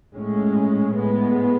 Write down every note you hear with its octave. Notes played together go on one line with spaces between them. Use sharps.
A2 G#3 C#4
A2 G#3 B3